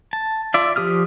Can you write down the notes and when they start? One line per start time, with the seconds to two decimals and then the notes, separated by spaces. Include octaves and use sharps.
0.13 A5
0.54 F4 D5 E5
0.76 F3 G4 D#6 F6